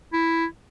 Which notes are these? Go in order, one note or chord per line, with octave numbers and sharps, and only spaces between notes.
E4